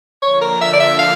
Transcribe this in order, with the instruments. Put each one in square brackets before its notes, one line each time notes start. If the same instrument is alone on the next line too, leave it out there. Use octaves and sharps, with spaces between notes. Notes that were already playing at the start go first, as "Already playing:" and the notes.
[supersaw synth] D3 F3 A#3 D4 [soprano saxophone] C#5
[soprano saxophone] A#4
E5
D5
E5
F5